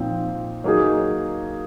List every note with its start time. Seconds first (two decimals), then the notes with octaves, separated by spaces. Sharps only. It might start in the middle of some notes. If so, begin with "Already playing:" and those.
Already playing: A#2 F3 C4 D#4
0.64 F#3 A#3 D#4 G#4